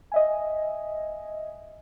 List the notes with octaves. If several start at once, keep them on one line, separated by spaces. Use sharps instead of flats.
D#5 E5 G#5